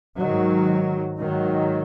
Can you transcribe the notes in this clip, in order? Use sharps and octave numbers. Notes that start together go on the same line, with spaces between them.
G#2 D#3 F#3
G#2 D#3 F#3